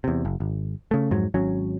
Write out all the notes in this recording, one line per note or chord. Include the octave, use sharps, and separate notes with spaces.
E2 C3
F#1
G#1
C#3 A3
F2 G#2 F#3
G#1 F#3 C#4